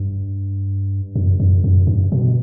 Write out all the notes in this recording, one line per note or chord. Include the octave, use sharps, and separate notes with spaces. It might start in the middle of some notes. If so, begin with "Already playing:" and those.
Already playing: G2
F#2
F#2
F#2
G2
B2